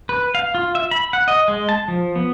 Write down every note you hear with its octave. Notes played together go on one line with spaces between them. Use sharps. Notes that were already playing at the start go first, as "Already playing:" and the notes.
B4
F5
F4
E5
B5
F#5
D#5
G#3
A5
F3
B3